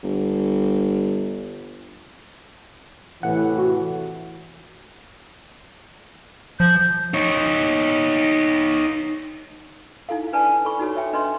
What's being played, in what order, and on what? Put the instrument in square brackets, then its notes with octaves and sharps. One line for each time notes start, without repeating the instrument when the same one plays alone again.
[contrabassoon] G1
[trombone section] A2 C3 E3 [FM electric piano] F#5
[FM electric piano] F#4
[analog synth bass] F3 [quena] G6
[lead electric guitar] D#4 C#5
[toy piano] D#4 E4 A4 F5
D4 B4 D5 G#5 A5
A4 B5 C#6
D#4 F#4 A4 C#5
C#5 E5 G5
D4 B4 D#5 E5 C6